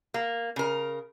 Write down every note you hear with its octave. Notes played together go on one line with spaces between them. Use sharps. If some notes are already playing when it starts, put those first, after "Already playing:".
A#3
C#3 A#4